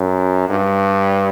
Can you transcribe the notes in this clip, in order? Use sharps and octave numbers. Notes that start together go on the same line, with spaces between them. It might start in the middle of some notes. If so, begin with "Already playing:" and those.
Already playing: F#2
G2